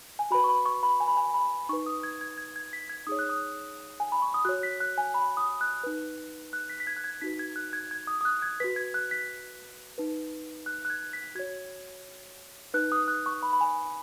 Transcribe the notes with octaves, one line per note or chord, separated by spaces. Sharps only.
G#5
F#4 B4 B5
C#6
B5
C#6
B5
G#5
B5
G#5
B5
D#4 B4 C#6
D#6
G#6
G#6
G#6
G#6
B6
G#6
D#4 G#4 C#5 D#6
F#6
D#6
G#5
B5
C#6
D#6
F#4 C#5 F#6
B6
F#6
G#5
B5
D#6
F#6
D#4 B4
F#6
B6
B6
G#6
F#6
G#6
D#4 F#4 B4 B6
G#6
F#6
G#6
G#6
D#6
D#6
F#6
G#6
F#4 B4 B6
G#6
F#6
B6
D#4 B4
F#6
F#6
G#6
B6
F#4 C#5 G#6
D#4 B4 F#6
D#6
F#6
C#6
B5
B5
G#5